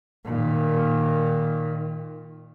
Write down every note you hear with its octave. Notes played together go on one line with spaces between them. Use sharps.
A#2 D#3